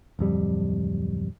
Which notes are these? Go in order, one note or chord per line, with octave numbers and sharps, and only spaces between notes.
D1 F2 G3